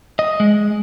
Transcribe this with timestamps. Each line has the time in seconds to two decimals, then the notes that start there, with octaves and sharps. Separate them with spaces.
0.19 D#5
0.40 G#3